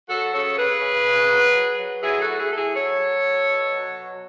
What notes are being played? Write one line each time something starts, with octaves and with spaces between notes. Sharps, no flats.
F#3 F#4 A4
C#3 A4 C#5
C#3 G#4 B4
C#3
C#3
F#3
F#3
F#3
F#3 E4 G#4
F#4 A4
A2
E4 G#4
A2 A4
E4 G#4
F#3 A4 C#5
F#3
F#3
B2
F#3
B2